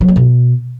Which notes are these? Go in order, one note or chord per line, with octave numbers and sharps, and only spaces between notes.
F#3
A#3
B2